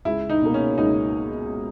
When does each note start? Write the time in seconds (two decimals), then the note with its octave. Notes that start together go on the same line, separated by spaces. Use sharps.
0.05 C#2 E4
0.30 D#4
0.42 B2 A#3
0.54 C#4
0.78 C#2 D#4